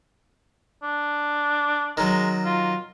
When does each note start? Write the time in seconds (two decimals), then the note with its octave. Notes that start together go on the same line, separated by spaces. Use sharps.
0.83 D4
1.97 D#3 F#3 G#3
2.45 F4